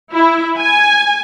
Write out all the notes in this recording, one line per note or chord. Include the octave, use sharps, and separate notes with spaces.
E4
G#5